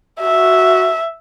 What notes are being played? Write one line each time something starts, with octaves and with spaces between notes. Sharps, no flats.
F#4 E5